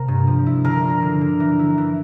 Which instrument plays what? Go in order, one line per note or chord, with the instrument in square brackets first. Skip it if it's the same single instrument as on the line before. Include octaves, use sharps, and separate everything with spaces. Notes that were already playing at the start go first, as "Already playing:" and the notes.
Already playing: [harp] C3 A#3 [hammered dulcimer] A#4
[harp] G2
F3
E4
[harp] D3 [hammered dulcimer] A#4
[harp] F4
D3
D3
E3
E4
E3